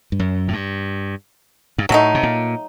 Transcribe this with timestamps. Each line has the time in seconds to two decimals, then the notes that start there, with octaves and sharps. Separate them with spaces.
0.12 G2
0.19 F#2
0.48 A2
0.53 G2
1.78 G2
1.89 A2 F#3 A3 D#4
2.15 C3
2.23 A#2